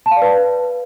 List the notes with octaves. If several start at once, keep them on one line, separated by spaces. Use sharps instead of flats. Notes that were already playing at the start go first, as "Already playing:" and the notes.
A5
F5
D5
B4